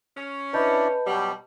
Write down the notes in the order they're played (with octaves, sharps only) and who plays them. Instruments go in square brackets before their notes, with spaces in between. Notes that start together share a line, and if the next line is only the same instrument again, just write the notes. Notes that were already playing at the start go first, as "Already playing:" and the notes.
[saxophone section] C#4
[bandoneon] D4 E4 D5 [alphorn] B4 [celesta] D#5 A5 G6
[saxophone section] B2 G3 [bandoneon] F#3 B3 G4